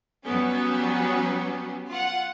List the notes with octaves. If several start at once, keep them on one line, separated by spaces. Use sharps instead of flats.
F#3 G3 B3 C#4
F4 F#5